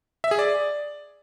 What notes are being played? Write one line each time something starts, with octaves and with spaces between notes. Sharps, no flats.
E5
G#4
D5